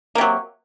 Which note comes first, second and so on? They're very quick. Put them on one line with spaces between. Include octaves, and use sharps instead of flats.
A#3 C3 F#3